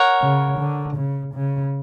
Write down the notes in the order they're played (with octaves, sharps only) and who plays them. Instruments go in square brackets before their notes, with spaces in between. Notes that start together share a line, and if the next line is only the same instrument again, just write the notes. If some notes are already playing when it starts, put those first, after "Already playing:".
Already playing: [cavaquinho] A#4 C#5 F#5
[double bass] C#3
D3
C#3
C#3